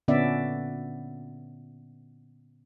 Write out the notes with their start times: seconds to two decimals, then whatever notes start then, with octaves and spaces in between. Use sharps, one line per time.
0.08 A#2 D3 B3 C#4 D5 E5